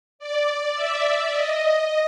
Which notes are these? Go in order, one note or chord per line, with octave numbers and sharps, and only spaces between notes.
D5
E5
E5
D#5
D#5